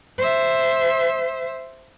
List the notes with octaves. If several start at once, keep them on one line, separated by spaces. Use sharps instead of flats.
C5 E5